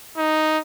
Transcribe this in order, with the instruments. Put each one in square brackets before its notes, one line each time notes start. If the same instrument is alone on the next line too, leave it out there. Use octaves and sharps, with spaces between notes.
[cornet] D#4